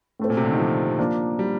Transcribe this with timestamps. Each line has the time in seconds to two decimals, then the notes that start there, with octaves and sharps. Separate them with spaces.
0.20 A2 A3 C4
0.30 A#2
0.37 C3
0.45 D3
0.52 D#3
0.59 F3
0.99 F3 A#3 D4
1.39 G3